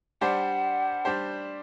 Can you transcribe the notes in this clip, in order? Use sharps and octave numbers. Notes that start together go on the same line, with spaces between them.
G3 D4 G4 C5 F#5
G3 D4 G4 C5